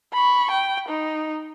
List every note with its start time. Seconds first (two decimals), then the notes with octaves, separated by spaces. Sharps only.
0.13 B5 C#6
0.51 G5
0.89 D#4